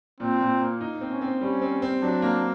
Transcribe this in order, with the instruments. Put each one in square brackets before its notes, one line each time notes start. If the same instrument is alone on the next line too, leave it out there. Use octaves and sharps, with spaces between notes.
[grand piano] A#2 [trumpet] C4
[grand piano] A#2
A#3
D#4
C4
[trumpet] C#4
[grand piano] C4
[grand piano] G3 [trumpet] C#4
[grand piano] C4
C4
[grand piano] F#3 [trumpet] D4
[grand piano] A#3